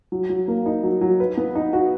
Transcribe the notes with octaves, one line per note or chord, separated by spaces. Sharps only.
F#3
F#3
A#3
D#4
F#3
F#3
B4
B3
D#4
F#4